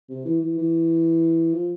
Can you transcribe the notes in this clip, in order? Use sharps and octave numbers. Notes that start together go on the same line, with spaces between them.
C3
E3
E3
E3
F3